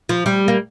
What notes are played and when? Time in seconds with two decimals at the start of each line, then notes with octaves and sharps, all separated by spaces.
0.09 F3
0.26 G3
0.48 A#3